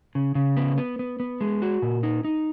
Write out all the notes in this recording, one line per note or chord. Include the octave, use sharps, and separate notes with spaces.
C#3
C#3
B3
B3
B3
B3
G#3
F#4
A#2
D#4
D#4